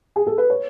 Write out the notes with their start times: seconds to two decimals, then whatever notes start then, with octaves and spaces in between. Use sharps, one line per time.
0.16 G#4
0.27 A4
0.38 B4
0.50 C#5